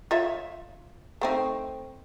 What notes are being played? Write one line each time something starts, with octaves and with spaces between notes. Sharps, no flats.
F4 C#5 E5
A3 C4 D#4